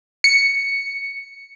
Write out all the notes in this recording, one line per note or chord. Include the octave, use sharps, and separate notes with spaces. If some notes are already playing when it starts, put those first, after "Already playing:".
C#7